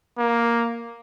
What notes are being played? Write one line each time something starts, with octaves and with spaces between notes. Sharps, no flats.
A#3